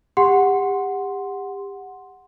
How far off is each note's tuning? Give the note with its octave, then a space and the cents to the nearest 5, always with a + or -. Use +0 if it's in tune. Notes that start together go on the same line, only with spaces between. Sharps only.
G4 +30 F#5 +0 C6 +0